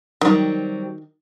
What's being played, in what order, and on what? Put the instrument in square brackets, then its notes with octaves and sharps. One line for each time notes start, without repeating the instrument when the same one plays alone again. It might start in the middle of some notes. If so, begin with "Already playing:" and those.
[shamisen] D#3 [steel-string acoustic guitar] F#3 G3 C4